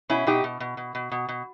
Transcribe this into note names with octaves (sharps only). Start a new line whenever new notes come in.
B2 C#4 E4
B2 D#4 G4
B2
B2
B2
B2
B2
B2